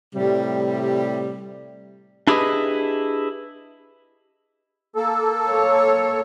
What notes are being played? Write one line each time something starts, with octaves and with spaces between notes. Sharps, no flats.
A2 C3 G3
D4 E4 G4 G#4 B4 D#5
A#3 A4
C#5